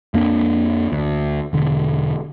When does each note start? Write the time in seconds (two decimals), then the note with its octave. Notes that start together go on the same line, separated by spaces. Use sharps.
0.14 F2 A#3 D4
0.92 D2
1.53 E1 D3